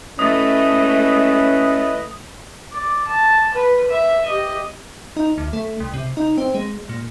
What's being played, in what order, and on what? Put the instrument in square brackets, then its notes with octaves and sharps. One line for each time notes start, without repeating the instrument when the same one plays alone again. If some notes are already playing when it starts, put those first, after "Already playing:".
[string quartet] A3 [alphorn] C#4 [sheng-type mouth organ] E4 B4 D#5 [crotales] D#6
[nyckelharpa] D5
A5
B4
E5
G4 D#5
[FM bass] D#4
D2
A3
C2
C3
D#4
C4
G#3
A#2